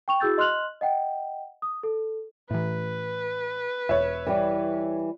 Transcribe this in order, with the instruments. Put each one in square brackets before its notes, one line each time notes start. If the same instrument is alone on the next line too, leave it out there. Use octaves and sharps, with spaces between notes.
[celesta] G5 C#6 F7
E4 F#4 G#4 E6 G6 A6
D#5 C6 F6 F#6 F7 F#7
D#5 F#5 G5
D#6
A4
[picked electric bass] A2 E3 [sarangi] B4
[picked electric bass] E1 [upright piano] C#5 E5
[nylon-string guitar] E3 G3